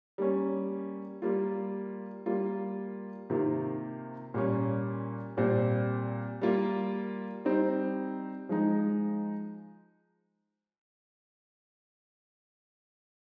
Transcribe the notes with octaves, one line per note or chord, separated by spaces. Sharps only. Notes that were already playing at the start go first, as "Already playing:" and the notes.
G3 A#3 C#4
G3 A#3 F4
G3 A#3 F4
C3 D#3 A#3 F4
A#2 G3 A#3 C#4
A#2 G3 C4
G3 A#3 F4
G3 C4 D#4
F3 G#3 D#4